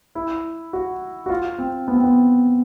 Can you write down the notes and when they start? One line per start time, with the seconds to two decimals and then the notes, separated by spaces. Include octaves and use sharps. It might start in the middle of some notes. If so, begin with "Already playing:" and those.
0.15 E4
0.73 F#4
1.26 F#4
1.30 F4
1.58 C4
1.88 B3
1.95 C4
2.04 B3